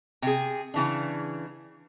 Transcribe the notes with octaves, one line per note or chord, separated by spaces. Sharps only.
C3 G#4
C#3 E3 D4